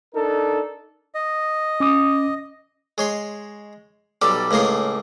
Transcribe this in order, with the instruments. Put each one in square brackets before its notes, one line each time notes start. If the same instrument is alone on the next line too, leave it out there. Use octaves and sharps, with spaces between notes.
[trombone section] D4 D#4 A4 A#4
[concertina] D#5
[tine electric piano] C#4 D6 D#6
[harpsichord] G#3 C#5 C6
B1 G3 A4 D5
C#2 A2 A#3 G#4 C6